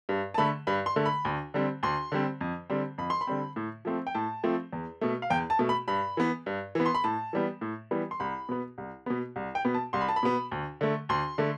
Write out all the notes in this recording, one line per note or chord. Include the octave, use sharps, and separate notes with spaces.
G2
A5
D3 A3 B5
G2 B5
C6
D3 A3
B5
D2
D3 G3 C4
D2 C6
D3 G3 C4
F2
D3 G3 C4
F2 B5
C6
B5
D3 G3 C4
A2
F3 A3 C4
G5
A2 A5
F3 A3 C4
E2
B2 A3
F5
E2 G5
A5
B2 A3
B5
G2 B5
E3 B3
G2
E3 B3
C6
B5
A2 A5
E3 G3 B3
A2
E3 G3 B3
C6
C2 B5
B2 B3
C2
B2 B3
C2
G5
B2 B3
A5
C2 C6
B5
A5
B5
B2 B3
D2
D3 A3
D2 C6
D3 A3